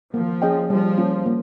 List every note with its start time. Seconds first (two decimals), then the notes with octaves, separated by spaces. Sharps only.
0.14 F3 A#3
0.42 C#4 G#4 D#5 G5
0.70 F3 G3
0.98 A#3 C#4 F4
1.26 A#3